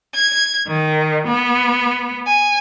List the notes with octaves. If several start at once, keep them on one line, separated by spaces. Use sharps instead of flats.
G#6
D#3
B3
G#5